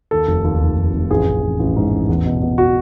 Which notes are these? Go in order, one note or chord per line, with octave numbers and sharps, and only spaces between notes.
D#2 A4
F1
D#2
F1
F1
F1
A1 G#4
A1
A1
A1
G#2
A1
E2
B2
B2
F#4